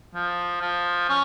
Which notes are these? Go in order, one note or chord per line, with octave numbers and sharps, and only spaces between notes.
F3
F3
C#4